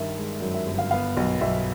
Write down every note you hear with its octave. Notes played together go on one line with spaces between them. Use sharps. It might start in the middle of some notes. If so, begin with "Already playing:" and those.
Already playing: G2 D#3 E5
G#3
F#2
E5
G1
F5
B3 F5
B1
B1 E5